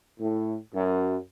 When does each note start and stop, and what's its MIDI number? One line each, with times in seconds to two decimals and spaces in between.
0.20 0.56 45
0.75 1.16 42